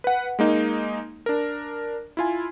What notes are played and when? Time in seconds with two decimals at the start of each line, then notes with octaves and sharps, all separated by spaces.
0.04 B4 F#5
0.39 G#3 A#3 D#4
1.26 D4 A#4
2.17 E4 F4 G#5